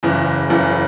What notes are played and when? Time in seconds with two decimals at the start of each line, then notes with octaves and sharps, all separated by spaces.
0.03 F#1 E2 C#3 E3
0.50 F#1 E2 C#3 E3